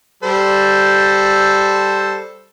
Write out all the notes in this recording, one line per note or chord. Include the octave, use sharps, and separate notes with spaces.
G3 A4 C5